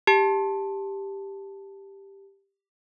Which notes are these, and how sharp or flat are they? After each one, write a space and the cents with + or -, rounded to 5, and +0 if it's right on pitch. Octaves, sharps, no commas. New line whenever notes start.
G4 +5 A5 +0